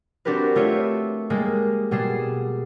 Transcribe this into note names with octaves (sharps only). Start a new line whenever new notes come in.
C4 D4 F#4 G4 A#4 B4
A3 F4 C#5 E5
G3 G#3 A#3
B2 G3 G#4 C7 E7